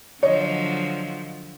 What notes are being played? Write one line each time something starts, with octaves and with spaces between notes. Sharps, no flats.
D3 F3 F#3 C#5 D#5